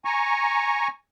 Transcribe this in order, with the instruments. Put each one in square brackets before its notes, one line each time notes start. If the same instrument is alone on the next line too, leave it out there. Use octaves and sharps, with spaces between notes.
[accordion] G#5 A#5 C#6